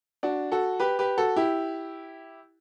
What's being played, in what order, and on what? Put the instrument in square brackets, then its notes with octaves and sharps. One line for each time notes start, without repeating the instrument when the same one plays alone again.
[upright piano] D4 F#4
F#4 A4
G4 B4
G4 B4
F#4 A4
E4 G4